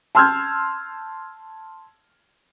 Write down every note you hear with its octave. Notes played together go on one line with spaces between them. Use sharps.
A5 C6 E6 F6 G6 G#6